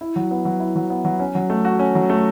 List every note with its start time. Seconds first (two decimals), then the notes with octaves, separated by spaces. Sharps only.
0.01 E4
0.16 F#3
0.31 B3
0.45 F#3
0.60 E4
0.76 F#3
0.90 B3
1.05 F#3
1.20 C#4
1.35 F#3
1.50 A3
1.65 F#4
1.79 C#4
1.95 F#3
2.09 A3